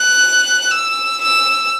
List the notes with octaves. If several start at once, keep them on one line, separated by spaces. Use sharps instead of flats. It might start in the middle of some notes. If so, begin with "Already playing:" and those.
Already playing: F#6
E6
E6